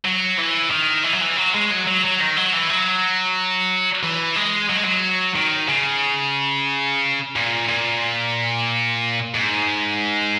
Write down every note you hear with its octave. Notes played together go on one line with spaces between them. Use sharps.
F#3
E3
D#3
E3
F#3
E3
F#3
G#3
F#3
F#3
F#3
D#3
F#3
E3
F#3
E3
G#3
F#3
G#3
F#3
D#3
C#3
A#2
A#2
G#2